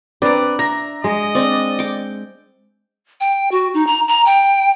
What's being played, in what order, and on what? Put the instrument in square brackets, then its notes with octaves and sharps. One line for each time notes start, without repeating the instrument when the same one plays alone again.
[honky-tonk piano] C4 B4 [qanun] D4 A#5 [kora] D5
[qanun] E5 [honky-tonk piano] A#5 A#6
[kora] G#3 [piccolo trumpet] D#5
[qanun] C4 D4 [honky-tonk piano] D5
[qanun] G5 D6
[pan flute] G5
F#4
D#4
A#5
A#5
G5